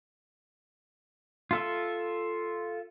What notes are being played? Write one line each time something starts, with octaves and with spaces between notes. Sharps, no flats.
F4 A4 E5